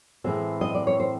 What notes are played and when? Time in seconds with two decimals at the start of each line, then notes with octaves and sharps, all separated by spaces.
0.24 A2 E3 G#3 C4 E5
0.61 D#5
0.75 D5
0.87 C#5
1.00 C5